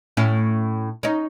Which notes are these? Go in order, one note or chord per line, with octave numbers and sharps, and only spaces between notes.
A2 C#4 E4
C#4 D#4